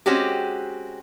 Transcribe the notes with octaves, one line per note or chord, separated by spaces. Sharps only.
G#3 C4 C#4 F#4 G4